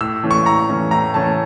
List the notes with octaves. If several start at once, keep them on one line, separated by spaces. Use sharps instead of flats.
A2 E6
E3 A3 C#4
C#6
A2 A#5
E3 A3 C#4
A2 A#5
E3 A3 C#4 A5